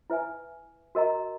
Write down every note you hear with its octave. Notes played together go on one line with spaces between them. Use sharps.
E4 B4 E5 G#5
F#4 A#4 D#5 A#5